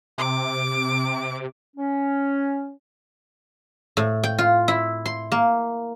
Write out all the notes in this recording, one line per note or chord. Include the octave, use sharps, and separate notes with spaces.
C3 D6
C#4
A2
G5
F4
E4
C6
A#3